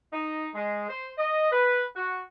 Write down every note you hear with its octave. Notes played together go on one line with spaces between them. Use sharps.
D#4
G#3
C5
D#5
B4
F#4